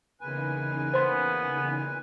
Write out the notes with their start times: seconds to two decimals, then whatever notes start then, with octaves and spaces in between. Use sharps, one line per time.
0.21 E2 A#2 C#3 D#4 B4 G#5
0.94 B3 C5 C6